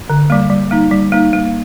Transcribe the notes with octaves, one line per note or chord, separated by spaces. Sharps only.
D3
G3 A#3
G3
A#3 D#4
G3
A#3 D#4
A#3